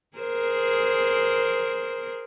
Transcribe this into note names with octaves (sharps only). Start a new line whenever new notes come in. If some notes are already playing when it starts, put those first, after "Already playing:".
G#4 A#4 C5